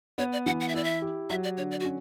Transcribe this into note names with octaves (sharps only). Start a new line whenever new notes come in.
B3 C#5
D5
E3 F#5
F#5
E5
E4 D5
E5
G4
F#3 E5
D5
D3 C#5
D5
F#4
C#4